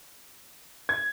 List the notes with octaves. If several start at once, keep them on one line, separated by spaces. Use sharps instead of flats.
G#6